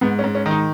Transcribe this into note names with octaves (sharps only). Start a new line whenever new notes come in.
G#2 B3
C#4
G#2
C#4
D#3
D#4